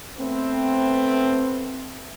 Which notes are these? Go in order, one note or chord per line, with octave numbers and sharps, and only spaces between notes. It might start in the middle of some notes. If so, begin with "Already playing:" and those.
A3 B3 C4